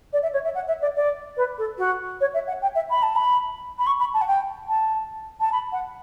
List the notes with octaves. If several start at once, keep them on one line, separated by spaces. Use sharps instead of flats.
D5
E5
C#5
E5
F#5
E5
D5
D5
B4
A4
F#4
C#5
E5
F#5
G5
E5
B5
A5
B5
B5
C#6
B5
A5
F#5
G5
A5
A5
B5
F#5